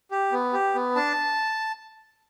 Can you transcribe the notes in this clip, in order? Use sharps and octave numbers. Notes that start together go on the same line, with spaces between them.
G4
B3
G4
B3
D4 A5